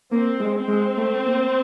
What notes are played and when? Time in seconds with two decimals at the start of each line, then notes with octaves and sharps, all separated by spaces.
0.12 A#3 C4
0.40 G#3
0.55 C4
0.68 G#3
0.97 A3
1.26 A#3